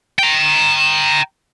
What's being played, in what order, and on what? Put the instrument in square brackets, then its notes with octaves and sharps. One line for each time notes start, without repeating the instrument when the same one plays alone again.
[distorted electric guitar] G5 A#5